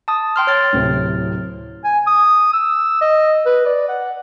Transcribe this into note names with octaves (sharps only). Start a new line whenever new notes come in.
A5 D#6
G5 C6 F6
C#5 F6 A6
D1 A2 C3
G#5
D#6
E6
D#5
B4
D5
F#5